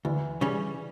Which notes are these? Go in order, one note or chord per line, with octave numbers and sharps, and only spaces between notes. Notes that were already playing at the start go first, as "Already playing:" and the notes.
D2 E3
C#3 G3 C#4